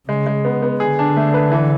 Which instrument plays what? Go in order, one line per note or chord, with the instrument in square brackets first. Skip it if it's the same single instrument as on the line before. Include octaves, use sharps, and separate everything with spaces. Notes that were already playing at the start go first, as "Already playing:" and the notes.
[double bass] C#3 [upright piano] G#3
[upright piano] G#3
B3
B3
[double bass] D3 [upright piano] G#4
[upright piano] D4
A3
B4
E3